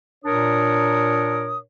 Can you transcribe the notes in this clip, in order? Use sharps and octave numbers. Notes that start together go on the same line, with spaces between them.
A#2 D4 A#4 C#5 D#6